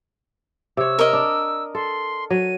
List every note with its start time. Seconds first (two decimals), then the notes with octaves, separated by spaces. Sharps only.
0.77 C3 C#5 E6
0.99 A#4 D#5
1.13 D4
1.75 A4 C6
2.30 F#3 D#7